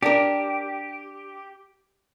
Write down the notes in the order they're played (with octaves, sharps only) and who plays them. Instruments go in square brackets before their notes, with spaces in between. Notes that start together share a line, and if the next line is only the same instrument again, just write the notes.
[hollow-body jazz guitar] D4 A#4 [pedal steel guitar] G4